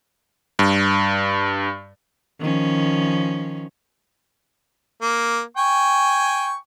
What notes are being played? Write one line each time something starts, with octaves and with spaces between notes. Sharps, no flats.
G2
D#3 F3 C#4
A#3
G5 G#5 C#6